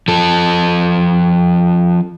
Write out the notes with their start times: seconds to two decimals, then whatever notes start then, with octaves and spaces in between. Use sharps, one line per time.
0.08 F3 A4